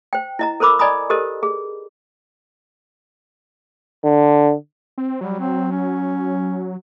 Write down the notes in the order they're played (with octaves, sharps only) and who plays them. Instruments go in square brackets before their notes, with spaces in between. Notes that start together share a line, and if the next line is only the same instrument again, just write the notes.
[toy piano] C5 G5
E4 D#5 A#5
A4 A#4 C5 B5 D6 E6
D5 D#5 G#5 A#5 B5 D#6
G4 A4 A#4 C5 D#5
G#4
[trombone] D3
[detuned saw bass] C4
[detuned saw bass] F#3 [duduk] G3
[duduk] C4
C#4